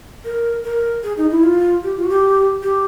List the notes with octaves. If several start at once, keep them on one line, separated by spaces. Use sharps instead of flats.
A#4
A#4
G#4
D#4
E4
F4
G4
F4
F#4
G4
G4